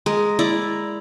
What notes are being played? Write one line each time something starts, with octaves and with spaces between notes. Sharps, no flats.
G#3 A#4
E4 D5 A#5